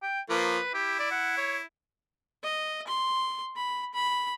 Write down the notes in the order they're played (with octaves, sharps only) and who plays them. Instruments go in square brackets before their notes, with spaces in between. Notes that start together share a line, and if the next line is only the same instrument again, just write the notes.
[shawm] G5
[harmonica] F3 A#3 [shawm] B4
[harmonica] E4 [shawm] G4
[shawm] D5
F#5
C#5
[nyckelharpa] D#5
C6
B5
B5